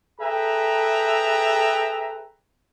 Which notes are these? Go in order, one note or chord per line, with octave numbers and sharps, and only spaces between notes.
G#4 A4 B4 E5 G5 A#5